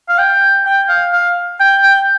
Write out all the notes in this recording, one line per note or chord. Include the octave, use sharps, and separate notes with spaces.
F5
G5
G5
F5
F5
G5
G5